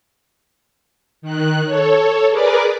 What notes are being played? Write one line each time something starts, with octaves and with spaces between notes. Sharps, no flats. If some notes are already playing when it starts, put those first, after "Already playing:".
D#3 F#6
A4 C#5
G#4 A#4 B4 D5 D6